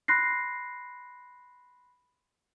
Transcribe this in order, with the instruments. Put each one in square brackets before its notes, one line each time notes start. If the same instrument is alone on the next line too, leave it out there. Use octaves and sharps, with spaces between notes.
[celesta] B5 C6 F#6 A#6 C7